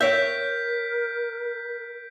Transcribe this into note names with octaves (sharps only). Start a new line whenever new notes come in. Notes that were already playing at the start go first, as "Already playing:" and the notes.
A#4 C#5 E5 G6 B6 D7